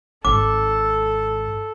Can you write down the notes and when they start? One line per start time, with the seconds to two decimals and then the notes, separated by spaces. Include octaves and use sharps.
0.25 G#1 G#2 A4 D6